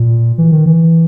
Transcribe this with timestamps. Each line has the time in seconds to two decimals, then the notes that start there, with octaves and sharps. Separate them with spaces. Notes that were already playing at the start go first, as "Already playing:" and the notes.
Already playing: A#2
0.38 E3
0.52 D#3
0.66 E3